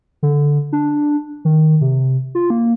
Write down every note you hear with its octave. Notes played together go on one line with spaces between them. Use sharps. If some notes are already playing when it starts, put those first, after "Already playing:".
D3
D4
D#3
C3
F4
A#3